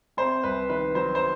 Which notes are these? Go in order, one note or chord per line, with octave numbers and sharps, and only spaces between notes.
C3 C5
C2 B4
D#3 B4
F#3 C5
C5